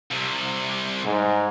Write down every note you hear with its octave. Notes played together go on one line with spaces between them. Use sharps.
C2 C3
G#2